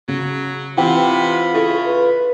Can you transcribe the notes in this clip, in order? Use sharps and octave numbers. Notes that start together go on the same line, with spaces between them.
C#3 F#3
C3 E3 F4 F#5 G5 B5
C#3 E4 A4
B4